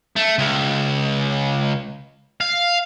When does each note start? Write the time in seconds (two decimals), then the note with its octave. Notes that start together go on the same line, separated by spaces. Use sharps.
0.16 A3
0.38 C#2
2.41 F5